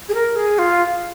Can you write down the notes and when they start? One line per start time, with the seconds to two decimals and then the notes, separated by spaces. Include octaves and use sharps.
0.09 G#4
0.14 A#4
0.36 G#4
0.58 F4